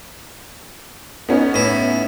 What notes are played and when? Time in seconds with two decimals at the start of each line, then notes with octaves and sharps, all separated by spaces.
1.29 B3 C#4 D#4
1.54 A2 E4